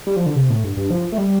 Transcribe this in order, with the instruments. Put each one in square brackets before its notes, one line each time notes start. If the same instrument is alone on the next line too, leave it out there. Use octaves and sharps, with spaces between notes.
[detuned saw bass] G3
F3
D3
C3
A2
G2
G2
F3
A3
G3